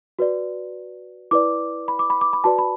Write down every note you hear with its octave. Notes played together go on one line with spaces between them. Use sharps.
F#4 B4 D5
E4 B4 D5 D6
B5
D6
B5
D6
B5
F#4 B4 D5 A5
B5